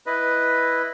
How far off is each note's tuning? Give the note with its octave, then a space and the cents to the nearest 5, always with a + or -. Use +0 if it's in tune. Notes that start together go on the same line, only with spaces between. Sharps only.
E4 +0 B4 +0 D#5 +0